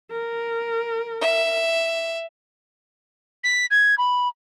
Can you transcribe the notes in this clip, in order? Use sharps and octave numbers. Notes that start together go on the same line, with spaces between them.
A#4
E5
B6
G#6
B5